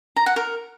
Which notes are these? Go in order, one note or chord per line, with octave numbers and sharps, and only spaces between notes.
A#5
F#5
A#4